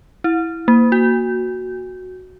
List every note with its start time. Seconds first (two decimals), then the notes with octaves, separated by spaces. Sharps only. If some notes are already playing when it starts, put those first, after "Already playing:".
0.24 E4
0.68 A#3
0.92 F#4